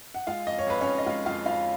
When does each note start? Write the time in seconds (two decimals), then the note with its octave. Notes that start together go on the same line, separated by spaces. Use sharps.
0.15 F#5
0.27 G#3 F4 F5
0.47 F2 D#5
0.59 C#5
0.66 F2 B4
0.81 C#4 C#5
0.86 F2
0.98 D#5
1.06 G#3 F4 F5
1.26 F2 F4 F5
1.46 F2 F4 F5